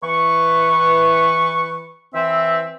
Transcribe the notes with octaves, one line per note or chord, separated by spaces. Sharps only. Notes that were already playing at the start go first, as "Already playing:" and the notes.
E3 B4 C#6
E3 C4 E5